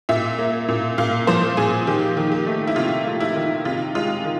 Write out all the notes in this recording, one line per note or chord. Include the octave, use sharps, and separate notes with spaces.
A#2 E5
A#3
A#2
A#2 F5
F3 C5
A#2 G#4
D#3 G4
D#3
G4
A3
E4
C3 F4
A3
E4
D#3
C3 F4
G#3 F4
D#3